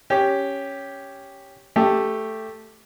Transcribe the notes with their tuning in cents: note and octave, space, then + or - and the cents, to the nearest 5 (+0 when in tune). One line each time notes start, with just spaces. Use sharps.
C#4 +0 G4 +0
A3 +0 G4 +0